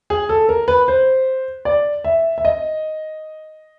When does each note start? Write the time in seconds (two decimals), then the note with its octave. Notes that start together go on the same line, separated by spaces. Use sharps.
0.10 G#4
0.29 A4
0.49 A#4
0.68 B4
0.88 C5
1.65 D5
2.04 E5
2.38 E5
2.45 D#5